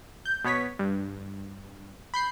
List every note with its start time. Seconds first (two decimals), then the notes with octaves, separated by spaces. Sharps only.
0.25 G6
0.44 B2 B3 C#5 B6
0.79 G2
2.14 B5 G6 C7